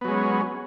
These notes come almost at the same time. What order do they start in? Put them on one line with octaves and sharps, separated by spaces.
B3 F#3 G#3 C#4